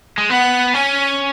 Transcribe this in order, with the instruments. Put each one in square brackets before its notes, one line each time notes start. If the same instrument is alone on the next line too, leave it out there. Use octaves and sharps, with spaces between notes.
[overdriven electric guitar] G#3
[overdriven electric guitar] B3 [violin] F#5
[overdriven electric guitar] C#4 [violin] G#5